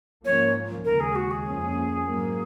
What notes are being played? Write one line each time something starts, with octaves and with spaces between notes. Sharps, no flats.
G#2 F3 A#3 C#4 C#5
D#2 C#3 G#3 A#4
G#4
F#4
G#4
F2 F3 A#3 C#4
G#2 F#3 A#3